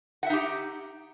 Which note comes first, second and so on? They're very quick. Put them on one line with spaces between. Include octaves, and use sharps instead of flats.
F#5 E5 D#4 G4